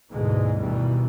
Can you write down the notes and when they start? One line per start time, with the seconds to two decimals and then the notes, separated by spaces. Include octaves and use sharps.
0.12 D2 G#2 B2 D3 E3 G#3
0.60 G2 B2 D#3 E3 G3